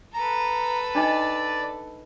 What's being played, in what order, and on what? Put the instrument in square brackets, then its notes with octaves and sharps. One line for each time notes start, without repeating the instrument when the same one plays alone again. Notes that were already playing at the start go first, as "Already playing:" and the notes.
[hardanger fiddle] A4 B4 [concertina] A#5
[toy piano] D4 D#4 D#5 [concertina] D5